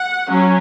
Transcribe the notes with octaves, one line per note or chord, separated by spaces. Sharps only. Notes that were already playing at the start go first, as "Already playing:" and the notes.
Already playing: F#5
F#3 C#4